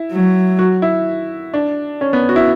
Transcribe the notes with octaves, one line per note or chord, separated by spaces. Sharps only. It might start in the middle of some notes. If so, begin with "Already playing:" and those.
Already playing: E4
F#3
F#4
E4
D4
C#4
B3
F#4
E4